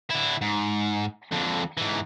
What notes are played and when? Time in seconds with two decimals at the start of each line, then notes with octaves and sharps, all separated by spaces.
0.10 D3 E4
0.42 G#2
1.32 F2 D3
1.77 G#2 E3